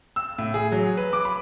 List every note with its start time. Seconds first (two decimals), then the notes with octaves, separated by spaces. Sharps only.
0.16 E6
0.38 A2
0.54 G#4
0.72 F#3
0.97 B4
1.13 D6
1.25 B5